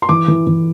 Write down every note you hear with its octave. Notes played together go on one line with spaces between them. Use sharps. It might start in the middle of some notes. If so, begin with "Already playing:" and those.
C6
E3 D6
E3
E3